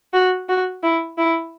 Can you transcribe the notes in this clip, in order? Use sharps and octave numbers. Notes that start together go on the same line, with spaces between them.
F#4
F#4
E4
E4